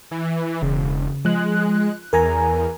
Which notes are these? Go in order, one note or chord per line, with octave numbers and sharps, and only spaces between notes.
E3
E1 C#3
F3 G#3 F#6
E2 A#4 G#5 A#5